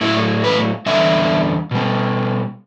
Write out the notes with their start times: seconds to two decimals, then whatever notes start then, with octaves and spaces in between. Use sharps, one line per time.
0.01 A2 F#3 A3 E4
0.44 B4
0.86 E2 D3 G3 E5
1.71 B2 G3